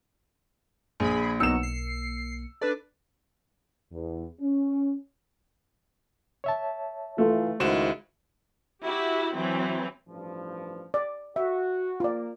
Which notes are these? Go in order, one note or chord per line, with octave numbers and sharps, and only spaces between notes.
A#1 G#4 B5
B1 B2 F#3 A#3 D#4 E6 C#7 E7
C7
D4 A4 B4 D5
E2
C#4
C#5 E5 A5
E3 A3 F4
C#2 D#3 G#3 E4 F#4 C5 E7
E4 F#4 G4
E3 F#3 C4
A1 G2 F3
D5
F#4 E5
A#3 F4 D5